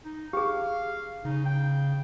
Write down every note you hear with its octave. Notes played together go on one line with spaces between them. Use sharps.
D#4
G4 G#4 F5
C#3 D#4
G5